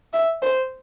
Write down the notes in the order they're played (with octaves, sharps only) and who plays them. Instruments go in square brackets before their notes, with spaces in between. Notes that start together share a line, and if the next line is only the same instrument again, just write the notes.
[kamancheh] E5
C5